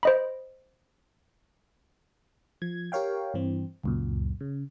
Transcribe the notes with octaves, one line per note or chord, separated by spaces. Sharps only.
C5 D#5 B5
F3 G#6
G4 A#4 C#5 F5 G5
G2 E3 C4
C#2 F#2 A#2
C#3